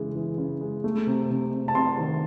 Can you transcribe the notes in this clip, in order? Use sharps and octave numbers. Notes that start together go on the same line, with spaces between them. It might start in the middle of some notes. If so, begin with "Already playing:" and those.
Already playing: C#3 E3 G#3
E3
C#3
G#3
A3
C3
C3
C3
A5
C3 C6
D#3